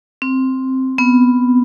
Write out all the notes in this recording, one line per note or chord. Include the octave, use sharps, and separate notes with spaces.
C4
B3